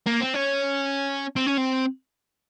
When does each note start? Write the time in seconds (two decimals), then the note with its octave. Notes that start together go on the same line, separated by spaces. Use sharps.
0.07 A#3
0.21 C4
0.34 C#4
1.36 C4
1.47 C#4
1.57 C4